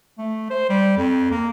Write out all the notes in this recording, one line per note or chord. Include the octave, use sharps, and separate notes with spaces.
A3
C5
G3
F2
A#3